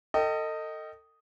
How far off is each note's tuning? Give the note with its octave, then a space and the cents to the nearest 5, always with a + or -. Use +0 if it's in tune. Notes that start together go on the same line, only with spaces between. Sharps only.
A4 +35 D#5 +0 G5 -15